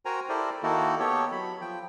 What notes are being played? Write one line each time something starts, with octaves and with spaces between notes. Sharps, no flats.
F#4 A#4 C5 G5 G#5 A#5
E4 G4 A4 A#4 C5 D5
D#3 A#3 D#4 E4 F#4 A4
B3 G4 A4 C#5
F#3 B5
F3 G5